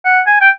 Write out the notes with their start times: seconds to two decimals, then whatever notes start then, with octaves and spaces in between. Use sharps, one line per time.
0.05 F#5
0.27 G#5
0.41 G5